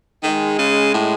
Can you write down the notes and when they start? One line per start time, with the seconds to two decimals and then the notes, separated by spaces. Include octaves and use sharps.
0.23 D#3 G#3
0.58 C#3
0.94 A2